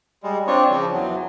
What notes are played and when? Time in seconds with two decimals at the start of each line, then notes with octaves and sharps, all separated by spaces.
0.23 G3 G#3
0.47 C4 D4 F4 C#5
0.70 C#3 F3
0.93 E2 F#3